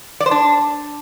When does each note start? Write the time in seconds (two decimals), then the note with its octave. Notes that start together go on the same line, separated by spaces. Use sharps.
0.20 D5
0.26 C5
0.31 D4